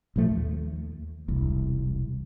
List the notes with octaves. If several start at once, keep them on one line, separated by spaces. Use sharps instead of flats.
A1 A#2 F3 A3
D#2
E1 C2